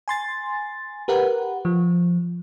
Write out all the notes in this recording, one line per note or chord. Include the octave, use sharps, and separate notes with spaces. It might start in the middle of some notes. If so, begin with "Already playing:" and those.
G#5 C6 A6
G4 A#4 B4 F#5
F3